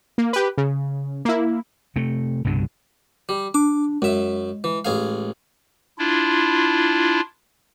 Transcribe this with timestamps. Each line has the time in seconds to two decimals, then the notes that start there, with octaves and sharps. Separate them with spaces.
0.18 A#3
0.33 G4 B4
0.58 C#3
1.25 A#3 E4
1.96 C3 A3
2.45 C2 G2 B2 D3
3.29 G3
3.54 D4 D6
4.02 F#2 G#3 E5
4.64 E3
4.85 A1 G#4 F5
5.99 D4 E4 F4